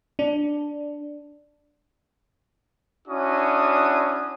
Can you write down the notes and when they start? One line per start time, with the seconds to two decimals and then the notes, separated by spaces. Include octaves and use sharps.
0.19 D4
3.08 C#4 D4 E4 F#4 D#6